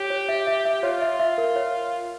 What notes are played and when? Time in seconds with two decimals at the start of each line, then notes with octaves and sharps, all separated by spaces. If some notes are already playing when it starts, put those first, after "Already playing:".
Already playing: G4 C#5
0.10 C#5
0.29 E5
0.47 E5
0.65 E5
0.83 F4 C#5
1.02 E5
1.19 E5
1.38 A#4
1.56 C#5